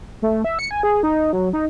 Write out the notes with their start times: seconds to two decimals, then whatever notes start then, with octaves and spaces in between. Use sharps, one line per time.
0.22 A3
0.44 E5
0.59 C#7
0.71 G#5
0.83 G#4
1.03 D#4
1.33 F#3
1.53 D#4